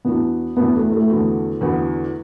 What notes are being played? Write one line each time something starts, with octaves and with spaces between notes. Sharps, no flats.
E2 E3 B3 D4 F#4
E2 E3 B3 D4 F#4
A3
A3
E2 D3 B3 F#4
E2 D3 B3 F#4